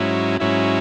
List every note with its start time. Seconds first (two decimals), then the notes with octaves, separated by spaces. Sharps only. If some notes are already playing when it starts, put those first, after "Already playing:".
Already playing: G#2 F#3 C#4 E4
0.40 G#2 F#3 C#4 E4